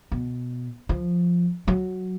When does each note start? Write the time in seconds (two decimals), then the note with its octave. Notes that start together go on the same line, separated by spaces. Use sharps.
0.12 B2
0.89 F3
1.68 F#3